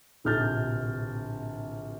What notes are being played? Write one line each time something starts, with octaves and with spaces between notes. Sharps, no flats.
D1 A#1 C3 F6 G6 A6